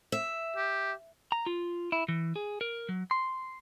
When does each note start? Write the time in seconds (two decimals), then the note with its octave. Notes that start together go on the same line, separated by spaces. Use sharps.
0.12 E5
0.57 G4
1.32 A#5
1.46 F4
1.92 E4
2.08 E3
2.36 G#4
2.61 A#4
2.89 F#3
3.11 C6